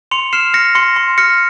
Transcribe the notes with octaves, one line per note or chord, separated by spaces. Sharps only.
C6 C#7 F7
F6 C7 E7
F6 A#6 C#7
C6 A#6 C#7
C6
F6 A#6 C#7